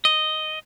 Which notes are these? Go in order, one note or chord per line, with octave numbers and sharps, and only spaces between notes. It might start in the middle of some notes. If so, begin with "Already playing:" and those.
D#5